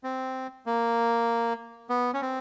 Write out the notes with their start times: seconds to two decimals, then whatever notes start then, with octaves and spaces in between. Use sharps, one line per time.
0.04 C4
0.66 A#3
1.89 B3
2.14 C#4
2.22 C4